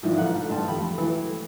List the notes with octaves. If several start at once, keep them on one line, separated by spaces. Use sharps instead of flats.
G#2 D#3 F3 D4 E4
A1 D3 F4 F#5 F#6
G2 A3 G5 A5 C6
F2 D3 G4 B5
E3 F#3 A3